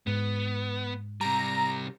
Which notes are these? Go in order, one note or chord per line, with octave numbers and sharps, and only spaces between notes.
G#2 B3
C3 G3 A#5